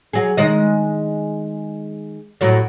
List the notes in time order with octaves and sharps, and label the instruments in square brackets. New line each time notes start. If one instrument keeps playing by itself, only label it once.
[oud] F#3 G#4
D#3 G#3 D#5
A2 F#3